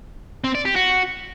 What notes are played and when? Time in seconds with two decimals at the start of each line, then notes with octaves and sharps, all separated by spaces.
0.44 C4
0.55 D5
0.65 G4
0.76 F#4